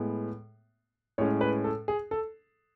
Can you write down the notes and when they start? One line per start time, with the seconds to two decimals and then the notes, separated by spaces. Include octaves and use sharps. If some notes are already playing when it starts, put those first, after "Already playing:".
Already playing: A2 G#3 B3
1.18 A2 G#3 C#4 C#5
1.41 B4
1.64 A4
1.88 G#4
2.11 A4